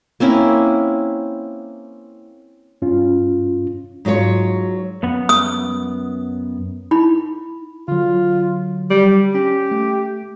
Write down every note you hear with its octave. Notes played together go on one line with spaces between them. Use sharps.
A#3 C4 C#4 E4
G2 C#4 F4
G#2 F#3 F4 B4 C#5
F#2 B3 F#5
D#6
D#4 E4 B5
D3 F#3 F4
G3
C#4 G4
A3